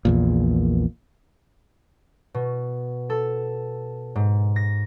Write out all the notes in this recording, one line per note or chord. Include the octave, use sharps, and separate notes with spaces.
A#1 E2 A#2
B2
A4
G#2
A#6